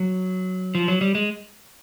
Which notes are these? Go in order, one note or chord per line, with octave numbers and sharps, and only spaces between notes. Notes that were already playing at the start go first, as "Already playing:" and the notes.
Already playing: F#3
F3
F#3
G3
G#3